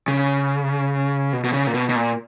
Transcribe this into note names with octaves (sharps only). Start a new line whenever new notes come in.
C#3
B2
B2
C#3
A#2
B2
B2
A#2